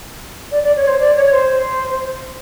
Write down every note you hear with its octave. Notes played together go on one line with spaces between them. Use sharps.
D5
D5
C#5
C5
D5
C#5
C5